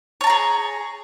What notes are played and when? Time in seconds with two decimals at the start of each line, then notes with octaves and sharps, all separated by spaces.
0.21 C#5
0.24 A5
0.27 A#5
0.30 G#4